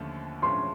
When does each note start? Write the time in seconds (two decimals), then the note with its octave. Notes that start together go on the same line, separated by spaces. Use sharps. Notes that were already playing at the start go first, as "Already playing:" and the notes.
Already playing: D#2 D3 F3 A3 C#4
0.42 A2 F3 G#3 C#4 C6